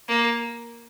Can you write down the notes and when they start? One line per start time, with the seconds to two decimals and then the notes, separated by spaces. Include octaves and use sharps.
0.08 A#3